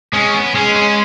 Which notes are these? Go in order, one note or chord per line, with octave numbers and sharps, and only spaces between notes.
G#3 C#4
B3
G#3 C#4
C#4